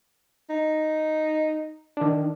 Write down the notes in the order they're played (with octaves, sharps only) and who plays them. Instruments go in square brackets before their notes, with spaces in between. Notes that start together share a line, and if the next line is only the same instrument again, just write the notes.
[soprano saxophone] D#4
[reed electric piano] D#3 D4